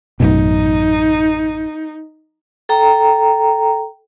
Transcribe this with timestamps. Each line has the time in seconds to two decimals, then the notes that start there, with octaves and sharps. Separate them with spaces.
0.20 A1 F#2 B2 D#4
2.69 A4 G5 A#5